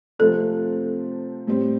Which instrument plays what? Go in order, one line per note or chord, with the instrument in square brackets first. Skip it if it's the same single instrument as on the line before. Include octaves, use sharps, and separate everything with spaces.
[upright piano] C3 F3 A3 C4 [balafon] A4
[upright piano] A2 G3 C4